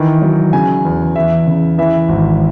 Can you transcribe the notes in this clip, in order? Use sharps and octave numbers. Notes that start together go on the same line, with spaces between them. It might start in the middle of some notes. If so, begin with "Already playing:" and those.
Already playing: D#3 E3
F#3
C#3 G#5
E2
E2 E5
C#3
E3 E5
G#1